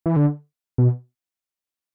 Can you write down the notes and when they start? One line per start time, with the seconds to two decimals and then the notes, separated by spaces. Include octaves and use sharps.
0.06 E3
0.16 D3
0.78 B2